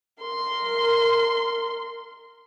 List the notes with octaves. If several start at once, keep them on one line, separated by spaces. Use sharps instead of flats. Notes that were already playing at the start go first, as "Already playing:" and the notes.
A#4 C6